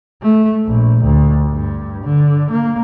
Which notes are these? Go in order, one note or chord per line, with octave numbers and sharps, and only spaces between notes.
A3
A#1
D2
G2
D3
A#3